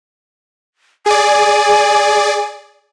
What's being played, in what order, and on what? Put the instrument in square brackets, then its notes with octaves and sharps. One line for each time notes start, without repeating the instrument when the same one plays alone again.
[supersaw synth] G#4 D5 [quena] G#5